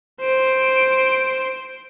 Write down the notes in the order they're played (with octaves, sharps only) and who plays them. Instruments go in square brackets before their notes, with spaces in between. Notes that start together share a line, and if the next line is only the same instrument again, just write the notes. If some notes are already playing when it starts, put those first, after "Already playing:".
[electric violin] C5 D7